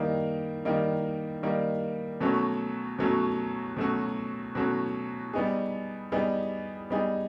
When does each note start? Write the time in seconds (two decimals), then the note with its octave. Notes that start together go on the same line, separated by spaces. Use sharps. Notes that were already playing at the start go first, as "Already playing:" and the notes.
Already playing: D#3 G3 A#3 D#4
0.65 D#3 G3 A#3 D#4
1.43 D#3 G3 A#3 D#4
2.21 B2 F#3 A3 C#4 F#4
2.99 B2 F#3 A3 C#4 F#4
3.77 B2 F#3 A3 C#4 F#4
4.55 B2 F#3 A3 C#4 F#4
5.33 G3 B3 D#4 G#4
6.12 G3 B3 D#4 G#4
6.90 G3 B3 D#4 G#4